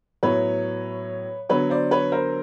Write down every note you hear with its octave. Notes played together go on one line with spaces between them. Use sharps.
A2 F#3 B3 B4 C#5
D3 F#3 B3 B4 C#5
C5 D5
B4 C#5
A#4 C5